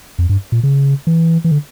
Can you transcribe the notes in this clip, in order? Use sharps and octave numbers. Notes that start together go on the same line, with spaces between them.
F2
G2
A#2
C#3
E3
E3
D3